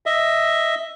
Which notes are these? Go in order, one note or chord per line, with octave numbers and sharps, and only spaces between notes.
D#5 E5